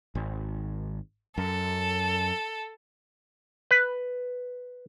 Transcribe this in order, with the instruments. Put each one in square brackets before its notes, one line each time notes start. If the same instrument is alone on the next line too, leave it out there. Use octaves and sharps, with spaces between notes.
[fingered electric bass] G#1
[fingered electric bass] F#2 [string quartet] A4
[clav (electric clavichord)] B4